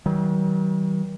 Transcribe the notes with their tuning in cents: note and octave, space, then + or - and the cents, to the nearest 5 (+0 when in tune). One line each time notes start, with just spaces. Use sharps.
D#3 +45 F#3 +45